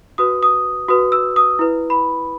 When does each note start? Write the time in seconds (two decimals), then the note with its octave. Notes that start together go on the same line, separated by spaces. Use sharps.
0.18 F#4 B4 D#6
0.43 D#6
0.89 F#4 B4 D#6
1.12 E6
1.36 D#6
1.59 E4 B4
1.90 B5